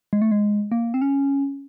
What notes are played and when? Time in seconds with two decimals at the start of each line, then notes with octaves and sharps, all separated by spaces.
0.13 G#3
0.22 A3
0.32 G#3
0.72 A#3
0.94 C4
1.02 C#4